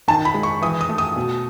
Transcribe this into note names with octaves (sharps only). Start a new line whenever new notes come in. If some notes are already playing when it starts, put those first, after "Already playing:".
D#3 A5
B5
G#3
C#6
E3 D#6
D#6
A3
D#6
B2